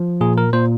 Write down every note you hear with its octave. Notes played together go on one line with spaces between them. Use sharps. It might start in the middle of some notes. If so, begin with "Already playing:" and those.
Already playing: F3
A#2 G#4
A#4
A#2 C5